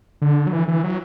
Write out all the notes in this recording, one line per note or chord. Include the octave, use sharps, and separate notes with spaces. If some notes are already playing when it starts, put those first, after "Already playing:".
D3
F#3
E3
E3
F#3